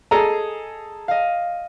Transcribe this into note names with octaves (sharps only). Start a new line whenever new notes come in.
G#4 A4 D#5 A#5 C7
D#5 F5